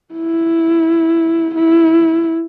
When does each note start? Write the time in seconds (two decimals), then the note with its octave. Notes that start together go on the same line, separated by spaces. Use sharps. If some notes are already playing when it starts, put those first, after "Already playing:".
0.14 E4
1.55 E4